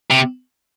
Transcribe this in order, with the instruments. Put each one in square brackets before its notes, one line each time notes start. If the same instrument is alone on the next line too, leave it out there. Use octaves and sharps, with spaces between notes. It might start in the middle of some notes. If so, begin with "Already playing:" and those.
[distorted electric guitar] C3